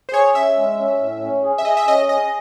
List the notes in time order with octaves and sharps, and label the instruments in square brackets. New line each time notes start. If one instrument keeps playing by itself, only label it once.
[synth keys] C5
[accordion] G#4 [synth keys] C#5
[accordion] C#4 [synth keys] E5
[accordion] G#3
C#4
A2
C#4
G#4
[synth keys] E5
[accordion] G#4 [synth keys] D#5
[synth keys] E5
[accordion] C#4 [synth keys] D#5
[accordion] G#4 [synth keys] D#5